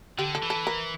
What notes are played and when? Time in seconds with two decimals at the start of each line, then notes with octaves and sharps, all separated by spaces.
0.18 D3 G4
0.35 A4
0.42 E3
0.50 A4
0.67 A#4